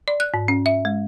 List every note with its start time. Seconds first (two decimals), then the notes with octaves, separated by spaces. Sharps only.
0.08 D5
0.20 F#6
0.34 G#2
0.48 C#4
0.66 E5
0.85 G#3